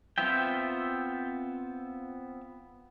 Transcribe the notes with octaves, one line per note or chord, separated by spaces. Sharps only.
B3 C4 F4 E5 G5